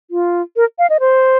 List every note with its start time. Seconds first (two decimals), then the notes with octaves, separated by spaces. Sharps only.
0.11 F4
0.56 A#4
0.79 F5
0.90 D#5
1.00 C5